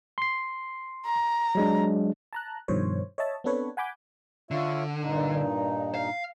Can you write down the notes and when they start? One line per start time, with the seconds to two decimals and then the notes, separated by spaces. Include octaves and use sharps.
0.18 C6 C7
1.05 A#5
1.55 F#3 G#3 D4
2.33 A5 A#5 F#6
2.68 G2 B2 D#3 F3 C5 C#5
3.18 C#5 D#5 E5 A5
3.44 B3 C4 D4 A4 B4 C#5
3.77 F#5 G#5 B5 D6 G6
4.51 D3 F4 C#5 E5
5.01 G2 A#2 D#4
5.95 F5